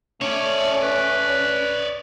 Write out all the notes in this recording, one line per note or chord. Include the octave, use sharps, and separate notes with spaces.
A3 C#4 C#5 D5
B4